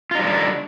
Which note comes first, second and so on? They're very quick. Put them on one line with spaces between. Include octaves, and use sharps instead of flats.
F4 D#4 G3 D3 D4